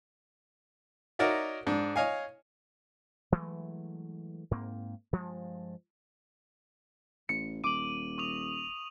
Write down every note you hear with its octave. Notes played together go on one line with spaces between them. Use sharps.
D#4 F#4 A#4 C#5 D5 E5
G#2 D4
C#5 D#5 F5 G#5
E3 F#3 G#3 A3
G#2 A#3 C4
G2 F3 G#3
A1 C#7
D#1 D6 D#7 F#7
C#6 D#6 F7